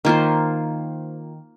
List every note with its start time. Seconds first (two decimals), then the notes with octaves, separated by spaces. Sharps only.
0.05 D#3 A#3 F4 C5